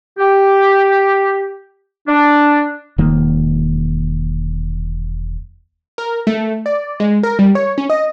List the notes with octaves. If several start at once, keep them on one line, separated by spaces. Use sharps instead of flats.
G4
D4
E1 D#3 A#3
A#4
A3
D5
G#3
A#4
G3
C#5
C#4
D#5